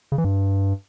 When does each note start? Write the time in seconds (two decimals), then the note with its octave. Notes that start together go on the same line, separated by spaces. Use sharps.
0.12 C#3
0.18 E3
0.24 G2